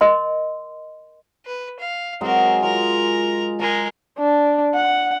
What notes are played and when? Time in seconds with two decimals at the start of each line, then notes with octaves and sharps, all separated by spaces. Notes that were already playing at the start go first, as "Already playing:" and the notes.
0.01 A#4 D#5 C6
1.46 B4
1.79 F5
2.21 F#3 G#3 C4 G#4 A#4
2.63 F4 A#4 A#5
3.59 G#3 A#4 A#5
4.18 D4
4.75 F#5